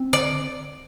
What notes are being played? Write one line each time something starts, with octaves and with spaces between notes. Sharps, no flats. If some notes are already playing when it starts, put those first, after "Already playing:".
Already playing: C4
D3 D5